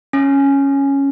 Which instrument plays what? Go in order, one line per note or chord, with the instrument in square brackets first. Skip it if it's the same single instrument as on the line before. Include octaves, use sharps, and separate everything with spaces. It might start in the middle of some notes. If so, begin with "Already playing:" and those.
[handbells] C#4